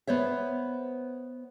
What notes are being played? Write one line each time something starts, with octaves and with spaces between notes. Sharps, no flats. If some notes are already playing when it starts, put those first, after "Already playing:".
B3 C5 C#5 E5